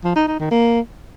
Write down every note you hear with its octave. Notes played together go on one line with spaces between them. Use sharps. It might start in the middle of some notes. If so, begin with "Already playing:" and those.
F3
D#4
D#4
D#3
A#3